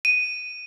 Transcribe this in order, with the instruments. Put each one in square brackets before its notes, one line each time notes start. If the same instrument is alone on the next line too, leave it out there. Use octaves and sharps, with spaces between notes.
[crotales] D#7